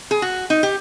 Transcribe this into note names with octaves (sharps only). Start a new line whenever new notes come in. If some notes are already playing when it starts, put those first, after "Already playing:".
G#4
F#4
D#4
G4